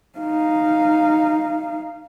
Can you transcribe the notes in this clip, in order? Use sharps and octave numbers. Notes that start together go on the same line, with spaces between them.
D#4 F5